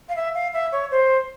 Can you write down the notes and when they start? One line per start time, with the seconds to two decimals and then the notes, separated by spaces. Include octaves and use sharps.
0.09 F5
0.16 E5
0.34 F5
0.53 E5
0.72 C#5
0.91 C5